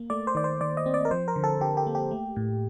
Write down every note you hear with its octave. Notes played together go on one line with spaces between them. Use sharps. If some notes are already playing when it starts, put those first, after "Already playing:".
Already playing: A#3
A3 D5
C5
D#3 D5
C5
D#3 D5
D#5
C4
D5
A#4
F3 C5
A#4
D3
A4
D3 G4
G4
A#3
G4
A3
A2